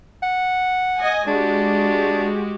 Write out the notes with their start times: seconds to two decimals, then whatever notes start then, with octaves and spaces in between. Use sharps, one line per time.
0.23 F#5
0.97 D#5 G#5
1.27 G#3 D4 F#4 G4